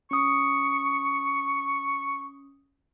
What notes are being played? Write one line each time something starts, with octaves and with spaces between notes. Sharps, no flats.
C#4 C#6 D#6